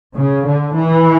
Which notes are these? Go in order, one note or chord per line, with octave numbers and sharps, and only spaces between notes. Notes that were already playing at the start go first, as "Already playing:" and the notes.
C#3
D3
E3